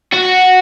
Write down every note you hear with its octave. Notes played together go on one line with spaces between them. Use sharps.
F#4